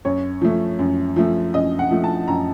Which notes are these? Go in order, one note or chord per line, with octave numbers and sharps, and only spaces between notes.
F#2 C#5
F3 A3
F#2
F3 A3
F#2 D#5
F#5
F3 A3
A5
F#2 A#5